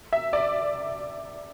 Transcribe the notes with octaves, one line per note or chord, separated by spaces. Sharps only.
E5
D5